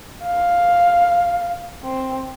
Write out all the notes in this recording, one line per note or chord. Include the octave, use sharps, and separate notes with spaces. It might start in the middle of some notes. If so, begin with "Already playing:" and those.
F5
C4